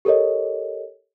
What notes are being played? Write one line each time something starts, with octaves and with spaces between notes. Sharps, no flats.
G4 A4 A#4 C#5 D#5